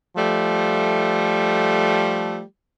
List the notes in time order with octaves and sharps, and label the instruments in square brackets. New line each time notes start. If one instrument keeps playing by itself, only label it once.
[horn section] F3 G3 A3